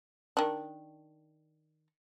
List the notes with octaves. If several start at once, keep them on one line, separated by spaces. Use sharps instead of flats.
D#3 D4